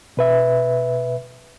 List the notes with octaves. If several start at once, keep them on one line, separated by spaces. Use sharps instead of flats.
B2 B4 E5